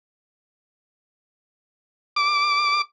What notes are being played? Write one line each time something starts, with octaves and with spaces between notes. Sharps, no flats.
D6